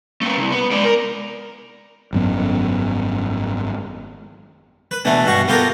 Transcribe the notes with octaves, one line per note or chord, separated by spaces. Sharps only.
A3 B3
C2
B3
G#3 D5
A#4
G#1 F#2 B3
B4
B2 E3 A3 D4
G2 B2 F#4 C#6
B3 F4 G4 A4 A#4